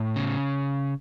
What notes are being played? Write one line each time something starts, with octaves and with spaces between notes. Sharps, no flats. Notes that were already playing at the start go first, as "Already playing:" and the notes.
Already playing: A2
C#3